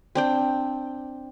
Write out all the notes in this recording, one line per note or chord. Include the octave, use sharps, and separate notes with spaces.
C4 D4 G5